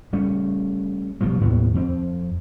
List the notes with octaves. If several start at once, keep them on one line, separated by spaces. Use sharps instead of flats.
G3 A3 C#4
B1 B2 F3 G3
D#2 A2 C3 B3
F2 C4